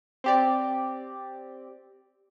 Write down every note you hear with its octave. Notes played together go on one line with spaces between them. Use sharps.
C4 G4 D5